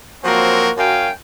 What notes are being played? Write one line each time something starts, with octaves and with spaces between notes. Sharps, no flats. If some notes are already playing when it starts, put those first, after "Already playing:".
F3 F#3 A#3 C4 F#4 A#4
F#2 F#4 A#4 F5 G5 G#5